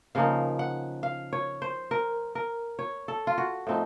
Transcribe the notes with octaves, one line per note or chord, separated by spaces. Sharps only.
C#3 F3 A#3 D#4 F5
F#5
F5
C#5
C5
A#4
A#4
C#5
A4
F4
F#4
A2 F3 C4 D#4